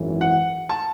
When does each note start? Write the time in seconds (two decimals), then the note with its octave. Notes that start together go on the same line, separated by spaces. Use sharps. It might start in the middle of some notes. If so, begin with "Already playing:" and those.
Already playing: G#1 F#2 E3
0.21 F#5
0.69 A5